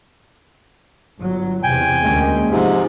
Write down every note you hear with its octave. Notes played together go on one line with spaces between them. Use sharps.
G1 F#3
E2 C3 G5 G#5
D2 G#3 A#3 C#4
G#2 C3 F3